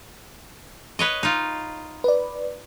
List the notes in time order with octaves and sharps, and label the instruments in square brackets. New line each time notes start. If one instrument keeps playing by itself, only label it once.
[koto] B4 C#5 D#5
D#4 F4
[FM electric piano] B4 D5